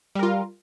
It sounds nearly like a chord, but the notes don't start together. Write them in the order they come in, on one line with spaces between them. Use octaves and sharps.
G3 A#4 F4